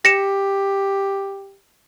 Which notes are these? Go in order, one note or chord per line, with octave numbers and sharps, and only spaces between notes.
G4 A#6 C#7 E7